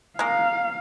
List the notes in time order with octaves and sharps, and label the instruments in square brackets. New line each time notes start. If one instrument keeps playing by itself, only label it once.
[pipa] G#3 A#3 [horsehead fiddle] F5